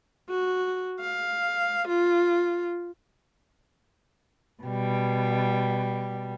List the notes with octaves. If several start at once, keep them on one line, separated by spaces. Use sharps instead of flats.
F#4
F5
F4
B2 G3